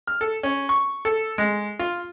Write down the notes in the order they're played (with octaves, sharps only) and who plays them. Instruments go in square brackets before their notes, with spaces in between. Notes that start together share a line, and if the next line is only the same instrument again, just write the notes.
[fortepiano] F6
A4
C#4
C#6
A4
G#3
F4